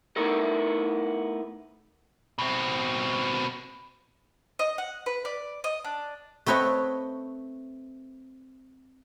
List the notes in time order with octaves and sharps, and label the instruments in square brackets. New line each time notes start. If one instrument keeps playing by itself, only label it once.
[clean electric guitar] A3 B3 D#4 E4 A4 A#4
[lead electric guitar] B2 C4
[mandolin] D#5
F#5
B4
D5
D#5
D4
[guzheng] A3 C4 B4 C#5 D#5